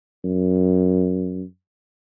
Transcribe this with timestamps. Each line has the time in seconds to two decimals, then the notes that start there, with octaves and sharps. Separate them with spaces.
0.25 F#2